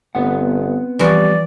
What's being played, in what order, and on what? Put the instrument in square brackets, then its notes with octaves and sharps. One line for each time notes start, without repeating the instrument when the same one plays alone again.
[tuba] G1 [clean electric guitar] B3 C4 F#5
[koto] E3 F3 F#4 [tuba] G3 [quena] D5